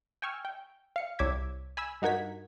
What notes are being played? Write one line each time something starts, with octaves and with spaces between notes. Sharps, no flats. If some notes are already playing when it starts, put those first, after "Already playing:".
G5 G#5 C#6 E6 F6
G5
F5 C#7
C2 C#5 D6 E6 G#6 B6
G#5 B5 E6
G2 D#4 F#4 A#4 G#6 B6